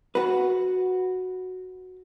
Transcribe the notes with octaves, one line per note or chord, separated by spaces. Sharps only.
F#4 B4